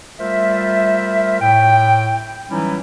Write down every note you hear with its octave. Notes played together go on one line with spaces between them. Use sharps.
G3 A3 F4 A#4 C5 E5
A2 G5
E3 F#3 G3 C#4 D#4 E4